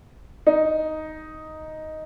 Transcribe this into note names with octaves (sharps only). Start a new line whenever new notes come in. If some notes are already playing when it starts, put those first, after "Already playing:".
D#4